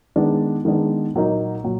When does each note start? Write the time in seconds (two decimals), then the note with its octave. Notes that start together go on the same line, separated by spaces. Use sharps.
0.16 D#3 G#3 B3 D4
0.65 D#3 G#3 B3 D4
1.14 A#2 F#3 A#3 D#4
1.64 A#2 F#3